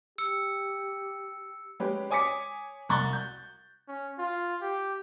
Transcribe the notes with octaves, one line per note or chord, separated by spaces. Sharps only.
G4 E6 C#7
G#3 C#4 G4 B4
C#5 G#5 D6 D#6 B6 C#7
C2 A#5 C#6 F#6 A6 G7
G6
C#4
F4
G4